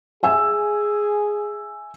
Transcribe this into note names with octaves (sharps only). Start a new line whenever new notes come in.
G#4 E5 G#5 E6